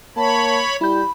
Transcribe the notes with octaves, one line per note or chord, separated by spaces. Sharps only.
A#3 C#5 A5 B5
G3 E4 B5 G6